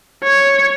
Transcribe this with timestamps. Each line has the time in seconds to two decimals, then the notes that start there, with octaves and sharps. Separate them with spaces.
0.24 C#5